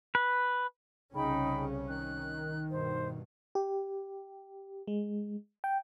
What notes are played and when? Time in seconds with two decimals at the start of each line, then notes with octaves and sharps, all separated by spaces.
0.15 B4
1.14 C2 C#3 C#4 D#4 G5 B5
1.90 D#3 F#6
2.69 G2 B2 C5
3.55 G4
4.87 G#3
5.64 G5